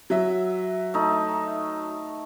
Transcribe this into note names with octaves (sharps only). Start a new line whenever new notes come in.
F#3 E5
A3 D#4